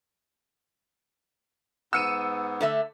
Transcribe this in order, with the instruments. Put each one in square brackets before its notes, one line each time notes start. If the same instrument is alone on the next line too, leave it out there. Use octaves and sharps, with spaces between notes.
[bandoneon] G#2 B3 [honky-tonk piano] E6 C#7 D#7
[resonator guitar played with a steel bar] D3 A3 E5